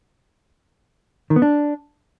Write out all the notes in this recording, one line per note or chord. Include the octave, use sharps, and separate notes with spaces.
D#3
B3
D4